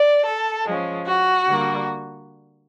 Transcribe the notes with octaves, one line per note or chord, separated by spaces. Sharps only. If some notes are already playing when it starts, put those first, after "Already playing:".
Already playing: D5
A4
F3 G#3 C#4
F#4
D3 G3 A#3